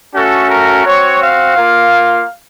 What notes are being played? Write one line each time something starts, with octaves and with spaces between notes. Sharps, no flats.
A3 C#4 F#4 A4
A#4
C4 F#4 C#5
F5
A#3 F4